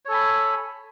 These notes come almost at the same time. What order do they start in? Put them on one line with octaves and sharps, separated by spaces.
C#5 A4 G#5 B5